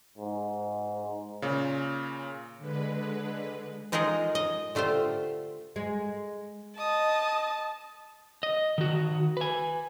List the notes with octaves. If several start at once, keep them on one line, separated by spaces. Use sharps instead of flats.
G#2
A#2 C#3
D3 G#3 B4
G#3 D#4 F4 G#4 A#4 D#5
D#5
D3 A3 F4 G4 C5
G#3
D#5 A5 D#6
D#5
D#3 F#4
B4 G#5